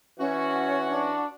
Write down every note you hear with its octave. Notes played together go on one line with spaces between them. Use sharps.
E3 C#4 F#4
D4